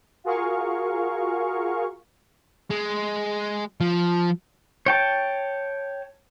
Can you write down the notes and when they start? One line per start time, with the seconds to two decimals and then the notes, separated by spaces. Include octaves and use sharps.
0.24 F4 F#4 G#4 A#4 F5 C#6
2.70 G#3
3.81 F3
4.86 C#5 G5 A5